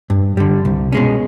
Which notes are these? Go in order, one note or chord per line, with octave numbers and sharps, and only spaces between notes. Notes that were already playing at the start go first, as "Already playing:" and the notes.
G2
D3 G3
C2
B2 G#3 C#4